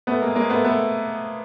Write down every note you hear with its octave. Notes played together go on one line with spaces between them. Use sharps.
A3 B3
G#3 A#3
G#3 A#3
A3 B3
A3 B3